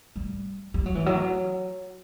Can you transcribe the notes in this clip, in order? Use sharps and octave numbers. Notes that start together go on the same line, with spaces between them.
G3
G3
F#3
E3
F#3